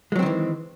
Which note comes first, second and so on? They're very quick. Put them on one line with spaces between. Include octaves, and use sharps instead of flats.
G#3 F#3 C4 D#3 E3